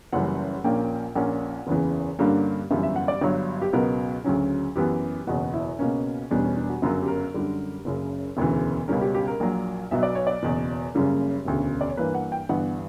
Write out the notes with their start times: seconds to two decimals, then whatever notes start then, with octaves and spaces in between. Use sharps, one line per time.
0.13 F#1 F#2 E3 G3 F#5
0.64 A#1 A#2 A#3 C#4 G5
1.16 A#1 A#2 A#3 C#4 F#5
1.67 F#1 E2 C#3 E3
2.19 G2 D3 G3 A#3 C#4
2.70 G1 F#2 E3 G3 E5
2.83 E5
2.96 F#5
3.08 D5
3.21 G1 G2 F#3 C#5
3.62 G4
3.73 C#2 B2 F#3 B3 A#4
4.24 D2 C#3 F#3 C#4
4.76 F#2 E3 B3 G4
5.27 F#1 E2 B2 F#4
5.54 E4
5.79 C#2 B2 A#3 C#4
6.31 E1 E2 B2 G3 C#4 D4
6.43 C#4
6.56 D4
6.69 F#4
6.82 G1 F#2 C#3 F#3 A#4
7.02 G4
7.08 A#4
7.34 F#2 D3 G3
7.85 F#1 F#2 C#3
8.37 E1 D2 C#3 E3
8.88 C#2 B2 G3 C#4 A#4
9.01 G4
9.15 G4
9.28 A#4
9.40 A#1 A#2 F#3 A#3
9.91 B1 B2 F#3 E5
10.03 D5
10.15 C#5
10.27 D5
10.43 F#1 E2 B2
10.94 F#1 F#2 C#3 G3 A#3
11.45 E1 D2 C#3
11.81 D5
11.89 C#5
11.97 G2 E3 A#3 B4
12.15 F#5
12.32 G5
12.49 G1 G2 E3 B3 F#5